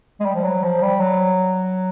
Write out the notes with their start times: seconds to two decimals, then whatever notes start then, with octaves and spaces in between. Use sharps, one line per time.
0.20 G#3
0.25 G3
0.35 F3
0.44 F#3
0.63 F3
0.82 G3
1.00 F#3